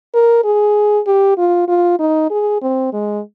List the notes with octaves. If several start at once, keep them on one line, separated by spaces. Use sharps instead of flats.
A#4
G#4
G4
F4
F4
D#4
G#4
C4
G#3